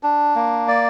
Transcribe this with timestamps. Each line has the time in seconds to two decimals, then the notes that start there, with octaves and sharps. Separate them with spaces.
0.03 D4
0.36 A#3
0.68 D5